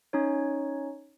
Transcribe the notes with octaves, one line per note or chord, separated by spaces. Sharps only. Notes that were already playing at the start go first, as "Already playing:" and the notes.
C#4 D#4 C#5